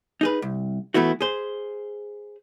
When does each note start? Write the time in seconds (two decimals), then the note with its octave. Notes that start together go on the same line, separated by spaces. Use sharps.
0.21 D#4 G#4 B4
0.42 C2
0.94 E3 G#3 A3 B3 E4 F#4
1.21 G#4 C5